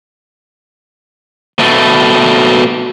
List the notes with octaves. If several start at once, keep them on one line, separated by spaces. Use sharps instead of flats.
B2 A3